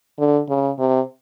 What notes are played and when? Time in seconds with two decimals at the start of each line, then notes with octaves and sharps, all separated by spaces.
0.19 D3
0.49 C#3
0.79 C3